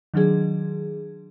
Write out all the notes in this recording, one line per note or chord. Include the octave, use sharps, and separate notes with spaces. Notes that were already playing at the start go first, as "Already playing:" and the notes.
D#3 F#3 D4 G#4